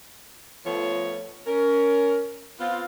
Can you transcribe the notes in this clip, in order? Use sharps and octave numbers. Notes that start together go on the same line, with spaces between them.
F3 A3 B3 A4 C#5
C#4 A#4
B3 C4 F4